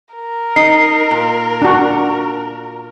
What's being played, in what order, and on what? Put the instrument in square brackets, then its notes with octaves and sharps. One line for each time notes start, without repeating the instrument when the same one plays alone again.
[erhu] A#4
[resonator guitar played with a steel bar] D#4 [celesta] C7
[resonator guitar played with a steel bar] A#2
[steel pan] D4 F#4